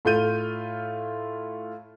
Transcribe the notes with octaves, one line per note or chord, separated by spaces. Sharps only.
A2 A3 F4 F6 G6 D#7